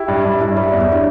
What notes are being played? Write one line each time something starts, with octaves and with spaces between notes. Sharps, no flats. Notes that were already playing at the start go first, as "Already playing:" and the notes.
Already playing: E4 G4 G5
G2
G2
G2 E4 E5
G3 E5
E2 D5
C#5
D4 D5